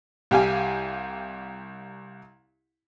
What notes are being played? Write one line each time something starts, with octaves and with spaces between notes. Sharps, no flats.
C2 G4 F5 G#5